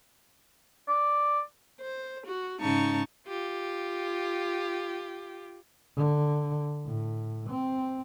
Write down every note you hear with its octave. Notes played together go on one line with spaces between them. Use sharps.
D5
C5
F#4
G#2 C#3 D#4 A5 C#6
F4 G4
D3
A2
C4